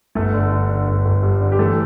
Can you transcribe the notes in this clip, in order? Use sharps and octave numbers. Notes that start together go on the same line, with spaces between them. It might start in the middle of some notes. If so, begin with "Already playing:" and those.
G1 A3 A4
D3
D3
D3
G1
G1
G2
D3
G4
E3 A3 A4